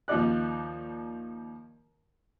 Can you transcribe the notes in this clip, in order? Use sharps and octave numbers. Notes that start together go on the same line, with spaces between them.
D#2 F3 D#4 D5 F#6